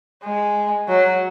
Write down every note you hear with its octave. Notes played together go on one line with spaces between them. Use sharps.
G#3
F#3